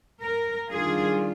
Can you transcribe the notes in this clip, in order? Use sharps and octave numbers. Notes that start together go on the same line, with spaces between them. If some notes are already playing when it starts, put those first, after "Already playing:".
A#4
D#3 G3 D4 F4 G#4